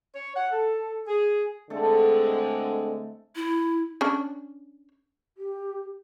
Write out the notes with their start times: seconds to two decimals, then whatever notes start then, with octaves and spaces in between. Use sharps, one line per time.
0.14 C#5
0.36 F#5
0.51 A4
1.08 G#4
1.70 D3 G#3 A3 C4 A4
3.36 E4
4.01 C#4 D4
5.38 G4